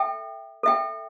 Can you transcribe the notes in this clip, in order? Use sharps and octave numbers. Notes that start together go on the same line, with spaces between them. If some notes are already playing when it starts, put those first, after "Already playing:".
Already playing: A4 E5 G5
A4 E5 G5